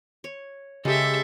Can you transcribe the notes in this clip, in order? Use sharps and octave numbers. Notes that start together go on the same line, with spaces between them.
C#5
C#3 G#3 G4 A4 E5